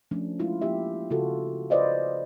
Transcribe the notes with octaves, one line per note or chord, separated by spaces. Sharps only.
F3 A3 C#4 D4
G#3 E4 F4
F3 A#3 E4 G4 E5
C#3 F4 F#4 A4
F4 B4 C5 D5 D#5 F5